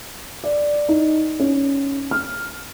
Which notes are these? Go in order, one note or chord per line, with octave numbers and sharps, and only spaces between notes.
D5
D#4
C#4
F6